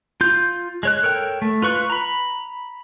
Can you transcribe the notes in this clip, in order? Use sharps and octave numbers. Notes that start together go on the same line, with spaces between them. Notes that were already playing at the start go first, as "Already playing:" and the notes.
F4 G6
G#3 C#5 F#6
A4 A#4 C#5 G5
A3
F4 B4 C#6 F#6
A#5 B5